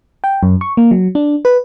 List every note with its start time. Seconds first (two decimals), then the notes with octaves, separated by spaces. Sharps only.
0.24 G5
0.43 F#2
0.61 C#6
0.77 A#3
0.91 F#3
1.15 D4
1.45 B4